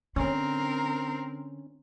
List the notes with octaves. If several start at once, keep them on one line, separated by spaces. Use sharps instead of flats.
D3 C4 C#4 A#4